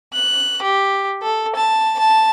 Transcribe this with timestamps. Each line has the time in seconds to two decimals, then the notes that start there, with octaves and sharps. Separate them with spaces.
0.14 F#6
0.62 G4
1.23 A4
1.55 A5
2.00 A5